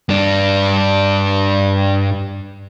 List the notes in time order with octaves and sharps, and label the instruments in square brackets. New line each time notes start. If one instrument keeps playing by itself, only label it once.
[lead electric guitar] G2 D4